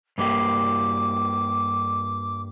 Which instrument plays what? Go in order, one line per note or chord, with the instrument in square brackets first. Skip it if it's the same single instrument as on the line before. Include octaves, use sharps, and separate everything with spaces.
[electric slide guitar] G2 A#3 G4 [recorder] D6